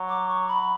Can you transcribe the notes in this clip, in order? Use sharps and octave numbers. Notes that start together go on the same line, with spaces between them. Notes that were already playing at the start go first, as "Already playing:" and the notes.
Already playing: F#3
D6
C#6
B5